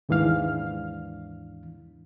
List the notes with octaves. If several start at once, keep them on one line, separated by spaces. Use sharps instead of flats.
D#2 G#2 E3 D4 F5 F6